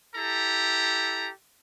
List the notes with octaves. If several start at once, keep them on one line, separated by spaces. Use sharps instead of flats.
E4 G4 A4 A#5